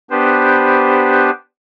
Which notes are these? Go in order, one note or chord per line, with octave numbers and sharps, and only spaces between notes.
B3 D4 G4 B4 C5